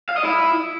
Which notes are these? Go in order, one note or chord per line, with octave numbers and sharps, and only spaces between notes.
F5
D#5
E4